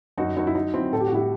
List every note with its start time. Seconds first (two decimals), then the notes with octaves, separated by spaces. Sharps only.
0.18 F#2 D#4 F#4
0.36 F#2 D#4 F#4
0.47 E4
0.55 F#3 D#4
0.74 F#3 C4 E4
0.93 A2 A4
1.00 G4
1.07 F#4
1.12 A2 E4 G4